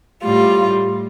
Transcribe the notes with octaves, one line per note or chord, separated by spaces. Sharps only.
A2 G3 F4